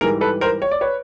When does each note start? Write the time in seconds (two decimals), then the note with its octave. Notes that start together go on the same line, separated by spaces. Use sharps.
0.01 G#2 E3 G3 G#4 A#4
0.21 A4 B4
0.41 A#4 C5
0.62 C#5
0.71 D5
0.81 B4 C#5